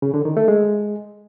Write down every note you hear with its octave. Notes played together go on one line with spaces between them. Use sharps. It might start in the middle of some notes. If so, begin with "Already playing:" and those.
C#3
D3
D#3
A3
G#3